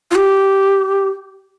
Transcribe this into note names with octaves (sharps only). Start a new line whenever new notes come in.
F4
G4